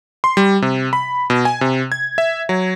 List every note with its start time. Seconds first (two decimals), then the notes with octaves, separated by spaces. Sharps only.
0.24 C6
0.37 G3
0.62 C3
0.93 B5
1.30 B2
1.45 G#5
1.61 C3
1.92 G#6
2.18 E5
2.49 F#3